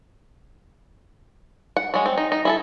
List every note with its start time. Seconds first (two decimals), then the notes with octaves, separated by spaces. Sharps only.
1.77 F#5
1.94 F#3 G#3
2.06 C4
2.18 D#4
2.32 D#4
2.45 E4 G#4 A4